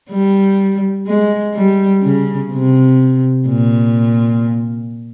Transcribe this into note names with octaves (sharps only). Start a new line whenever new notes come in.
G3
G#3
G3
C#3
C3
A#2